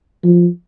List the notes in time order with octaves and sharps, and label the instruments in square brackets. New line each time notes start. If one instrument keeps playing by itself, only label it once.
[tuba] F3